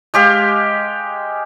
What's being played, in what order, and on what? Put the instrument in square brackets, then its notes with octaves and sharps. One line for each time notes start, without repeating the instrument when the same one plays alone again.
[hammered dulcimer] G#3 G4 F5